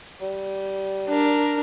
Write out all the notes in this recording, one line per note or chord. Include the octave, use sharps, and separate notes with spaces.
G3
D4 A#4